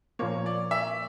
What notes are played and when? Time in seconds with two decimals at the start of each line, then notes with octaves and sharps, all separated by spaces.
0.19 A#2 F3 A#3 C#5
0.46 D5
0.71 E5